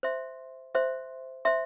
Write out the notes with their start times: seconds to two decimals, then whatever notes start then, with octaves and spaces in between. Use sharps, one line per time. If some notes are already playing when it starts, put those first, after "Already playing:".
0.03 C5 E5 C6
0.75 C5 E5 C6
1.45 C5 E5 C6